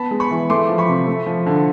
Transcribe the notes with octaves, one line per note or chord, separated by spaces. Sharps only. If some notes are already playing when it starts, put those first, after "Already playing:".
Already playing: B3 A5 B5
G#3
B5 C#6
E3
A3 C6 D6
F3
B5 C#6
C3
A3
F3
D3